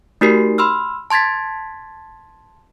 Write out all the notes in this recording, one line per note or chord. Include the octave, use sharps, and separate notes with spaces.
A3 D#4 F#4 G4 A#4 C7
B5 C6 E6 F6
A5 C6 G#6 A6 B6